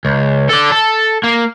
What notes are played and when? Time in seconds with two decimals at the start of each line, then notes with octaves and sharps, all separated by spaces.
0.05 C#2
0.49 A4 D5
0.72 A4
1.24 A#3